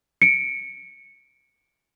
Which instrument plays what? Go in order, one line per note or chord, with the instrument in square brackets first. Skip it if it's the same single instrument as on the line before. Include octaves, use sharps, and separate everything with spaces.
[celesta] C#7 D7